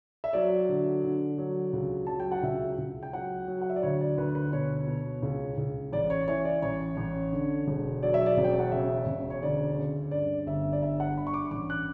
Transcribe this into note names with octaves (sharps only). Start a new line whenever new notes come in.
E5
F#3 D5
D3
D3
F#3
C#2
F#3 A5
G5
F#5
C#2 E5
C#2
G5
F#3 F#5
F#3
F#5
E5
D5
D2 C#5
D5
D2 B4
B4
B2 C#5
B2
C#2
C#2
A1 D5
C#5
E3 C#5
D5
A1 C#5
A1
D3
E1
F#3 D5
E5
D5
E1
G5
F#5
C#3 E5
E1
C#5
D2 D5
C#3
G2 D5
G1 E5
D5
G2 E5
F#5
G2 B5
C#6
D6
A1 D6
F#6